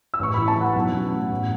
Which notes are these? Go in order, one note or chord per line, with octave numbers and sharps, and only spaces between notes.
E6
A1 C#6
E3 B5
A5
E3 F#5
B1
C#4
A2
A1